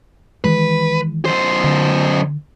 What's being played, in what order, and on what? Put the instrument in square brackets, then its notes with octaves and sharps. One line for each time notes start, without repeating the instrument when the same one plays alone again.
[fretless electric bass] D#3 E3 G#3 [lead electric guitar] B4
[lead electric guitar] F#2 C5
[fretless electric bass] D3